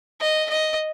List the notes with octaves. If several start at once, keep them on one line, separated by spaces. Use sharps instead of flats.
D#5
D#5